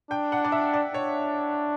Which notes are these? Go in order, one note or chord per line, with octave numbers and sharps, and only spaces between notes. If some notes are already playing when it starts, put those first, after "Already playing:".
D4 G5
F#5
D5
E5
D5
D4 C#5